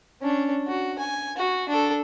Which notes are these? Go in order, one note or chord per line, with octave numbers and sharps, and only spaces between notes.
C#4 D4
F#4
G#5
F#4
D4 A4